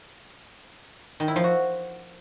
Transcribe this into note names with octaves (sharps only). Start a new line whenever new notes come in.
D#3
E4
F3
F#4